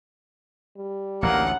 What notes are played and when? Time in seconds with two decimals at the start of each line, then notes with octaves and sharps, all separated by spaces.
0.77 G3
1.23 A1 D2 A#3 F#5